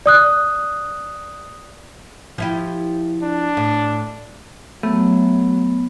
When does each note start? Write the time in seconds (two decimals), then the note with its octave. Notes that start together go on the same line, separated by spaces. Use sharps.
0.06 D5 D#6 F#6
2.38 F3 E4 G4
3.22 D4
3.57 A2
4.83 F#3 A3 B3